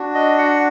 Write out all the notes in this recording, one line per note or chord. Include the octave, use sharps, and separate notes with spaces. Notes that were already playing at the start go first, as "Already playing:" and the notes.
Already playing: D4 F#4
D#5
F#5